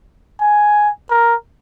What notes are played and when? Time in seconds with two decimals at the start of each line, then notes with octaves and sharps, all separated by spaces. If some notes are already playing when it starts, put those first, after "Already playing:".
0.40 G#5
1.10 A#4